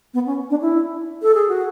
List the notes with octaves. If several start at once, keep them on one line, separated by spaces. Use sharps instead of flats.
B3
C#4
D4
E4
A4
G#4
F#4